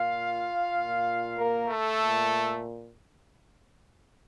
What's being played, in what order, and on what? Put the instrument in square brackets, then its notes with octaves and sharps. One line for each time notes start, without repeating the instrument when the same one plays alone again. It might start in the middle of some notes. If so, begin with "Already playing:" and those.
Already playing: [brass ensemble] A#2 F4 F5
A#2
A#3 A#4
A3 A4
A#2